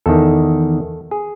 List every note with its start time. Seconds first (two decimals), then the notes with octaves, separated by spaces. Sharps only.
0.06 E2 D#3 A4
1.11 G#4